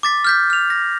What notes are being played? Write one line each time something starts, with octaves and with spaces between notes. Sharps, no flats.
D6 A6 B6
F6 G6 B6
F6 F7
A#6